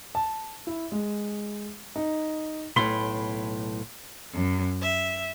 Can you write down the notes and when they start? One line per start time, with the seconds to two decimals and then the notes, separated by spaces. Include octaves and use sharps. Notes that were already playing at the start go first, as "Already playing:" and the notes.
0.15 A5
0.67 E4
0.92 G#3
1.96 D#4
2.76 B1 A2 B5 C6
4.32 F#2
4.80 E5